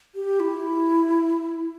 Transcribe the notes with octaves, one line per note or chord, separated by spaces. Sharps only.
G4
E4